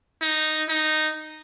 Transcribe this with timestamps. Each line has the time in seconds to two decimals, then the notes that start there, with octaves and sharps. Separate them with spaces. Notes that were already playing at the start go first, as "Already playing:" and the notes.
0.22 D#4
0.69 D#4